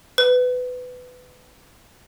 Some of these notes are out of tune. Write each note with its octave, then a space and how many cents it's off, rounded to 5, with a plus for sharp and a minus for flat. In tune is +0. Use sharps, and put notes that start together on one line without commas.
B4 +20